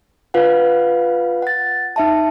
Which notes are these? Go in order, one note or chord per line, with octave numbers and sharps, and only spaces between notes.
F4 B4 F5 F#5
F#5 A6
D#4 E5 A5